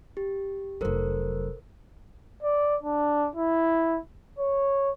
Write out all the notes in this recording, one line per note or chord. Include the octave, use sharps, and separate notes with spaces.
G4
F1 F#3 A4 A#4 C5
D5
D4
E4
C#5